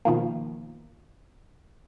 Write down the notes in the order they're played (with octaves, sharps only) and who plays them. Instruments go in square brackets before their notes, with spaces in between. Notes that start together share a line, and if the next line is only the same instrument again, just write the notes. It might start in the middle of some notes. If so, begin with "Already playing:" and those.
[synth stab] B2 D#3 F3 A#3